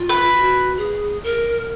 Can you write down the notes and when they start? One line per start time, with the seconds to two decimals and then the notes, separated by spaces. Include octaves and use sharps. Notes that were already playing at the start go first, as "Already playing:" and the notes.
Already playing: F4
0.09 B4
0.32 F#4
0.77 G#4
1.23 A#4